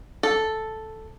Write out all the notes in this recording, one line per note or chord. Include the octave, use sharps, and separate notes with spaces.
A4